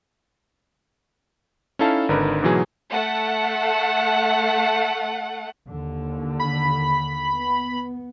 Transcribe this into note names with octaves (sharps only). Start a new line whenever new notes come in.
C#4 D#4 E4 A4 F5 A5
G#1 D3 D#4 A#4 B4
G#2 B2 E3 F#3 G#4
A3 F#5
D#2 D3
B5
B3